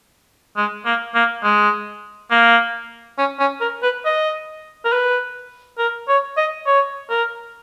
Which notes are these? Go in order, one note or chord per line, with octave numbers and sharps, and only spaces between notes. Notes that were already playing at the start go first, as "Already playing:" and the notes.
G#3
A#3
A#3
G#3
A#3
C#4
C#4
A#4
B4
D#5
A#4
B4
A#4
C#5
D#5
C#5
A#4